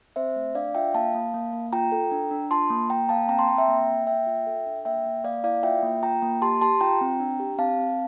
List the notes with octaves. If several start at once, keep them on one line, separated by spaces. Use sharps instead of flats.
C4 C5 E5
A3
D4 D5 F5
F4 E5 G5
A#3 F5 A5
A#3
A#3
A#3
F4 G5 A#5
A4
D4
D4
F4 A5 C6
A#3
A#3 G5 A#5
A#3 F5 A5
C4 G5 A#5
A5 C6
C4 G5 A#5
E5 G5
A#3
A#3
A#3 E5 G5
F4
A4
D4
A#3 E5 G5
A#3
A#3 D5 F5
E4 D5 F5
F4 E5 G5
A#3
F4 G5 A#5
A#3
G4 A5 C6
G4 A5 C6
F4 G5 A#5
C4
D4
G4
C4 F5 A5
C4